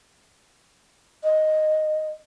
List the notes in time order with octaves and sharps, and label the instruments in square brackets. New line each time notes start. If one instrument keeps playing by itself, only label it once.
[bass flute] D#5